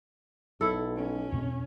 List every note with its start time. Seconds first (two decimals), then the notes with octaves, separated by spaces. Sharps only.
0.61 B1 E4 A4
0.96 C#4
1.32 E2 B2 C4